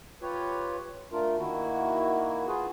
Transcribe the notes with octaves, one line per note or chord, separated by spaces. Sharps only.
F4 G4 B4 C#5
A3 D4 F4 A#4
D#3 A#3 E4 F#4
F4 F#4 G#4 B4